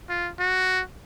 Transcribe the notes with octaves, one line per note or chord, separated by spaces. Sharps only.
F4
F#4